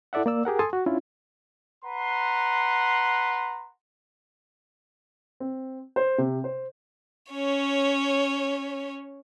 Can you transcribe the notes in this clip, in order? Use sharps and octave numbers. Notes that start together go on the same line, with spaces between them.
E4 A4 D5 E5 F#5
A#3 D5 E6
G4 G#4 A#4 F#5
A4 G#5 A5 C6 D#6
F#4
C#4 D4 E4 F4
B4 F#5 A#5 C6
C4
C5
C3
C5
C#4 C#5